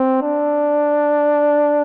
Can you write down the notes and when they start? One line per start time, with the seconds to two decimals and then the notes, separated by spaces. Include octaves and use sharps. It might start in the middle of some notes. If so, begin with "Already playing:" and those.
Already playing: C4
0.22 D4